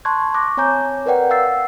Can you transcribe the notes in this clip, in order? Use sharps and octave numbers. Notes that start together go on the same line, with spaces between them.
A5 C6 C#6 F#6 G#6
C#6 D6 F#6 A#6
C4 C#5 G#5 A#5 G6
A#4 B4 D5 F#5 G5
F5 F#5 E6 A6 C7